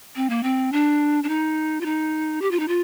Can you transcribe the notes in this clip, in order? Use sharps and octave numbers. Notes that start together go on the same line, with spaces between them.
C4
A#3
C4
D4
D4
D#4
F4
D#4
G4
F4
D#4
F4